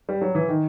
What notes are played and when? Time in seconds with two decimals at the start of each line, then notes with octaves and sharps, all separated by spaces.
0.09 G3
0.21 F#3
0.35 E3
0.49 D#3